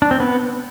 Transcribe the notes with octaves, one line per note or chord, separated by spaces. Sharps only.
D4
C4
B3